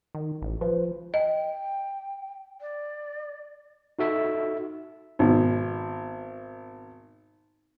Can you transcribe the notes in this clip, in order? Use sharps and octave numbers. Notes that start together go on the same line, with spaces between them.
D#3
A1
F3 B4 C5
D#5 G5
D5
D#4 F#4 A4 E5
G#1 B2